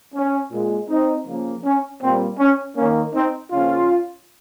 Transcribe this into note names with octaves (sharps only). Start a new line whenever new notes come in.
C#4
A#2 G#3
C4 D#4
C#3 F3 A#3
C#4
A#2 G3 A#3 C4
C#4
D#3 A#3 C#4
C4 D#4
C#3 F3 A#3 C#4 F4